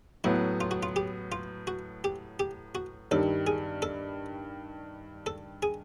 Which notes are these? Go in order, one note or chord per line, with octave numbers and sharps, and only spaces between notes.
A2 F#3 B3 E4
F4
F#4
F4
G4
F4
F#4
G4
G4
F#4
G2 D#3 G3 A4
G#4
A4
A4
G#4